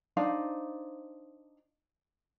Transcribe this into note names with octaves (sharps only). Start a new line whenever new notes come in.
D4 D#4 C5 F5